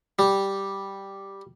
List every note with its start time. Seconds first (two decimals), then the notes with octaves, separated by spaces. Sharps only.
0.19 G3